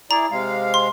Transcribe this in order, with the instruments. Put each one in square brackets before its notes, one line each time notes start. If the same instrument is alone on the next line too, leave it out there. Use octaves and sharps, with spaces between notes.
[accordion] E4 G#4 D5 [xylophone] A#5
[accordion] C3 G#3 F5
[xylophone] C6